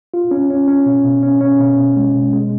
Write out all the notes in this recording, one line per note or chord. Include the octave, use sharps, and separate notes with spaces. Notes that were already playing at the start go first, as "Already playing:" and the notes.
F4
C#4
C#4
C#4
B2
B2
C#4
C#4
B2
B2
G#3
B2
G#3